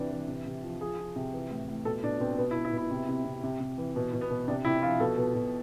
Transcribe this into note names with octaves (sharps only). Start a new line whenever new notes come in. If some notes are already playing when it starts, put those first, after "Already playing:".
Already playing: C3 E3 D4
E3
C3
C3
F3
F3 G#4
F3
C3
E3
A2
A2
B2 A4
B2 D4
B2 C4
B2 B3
E4
B2
E4
B2
E4
C3
C3
C3
C3
C3
E3
B2
B2
B3
B2
C3 D4
C3 E4
F3 F4
B2 A4
B2
B2